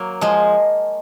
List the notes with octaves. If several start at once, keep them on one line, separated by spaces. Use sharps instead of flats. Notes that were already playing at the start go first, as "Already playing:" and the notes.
Already playing: F#3 A#3
F3 G#3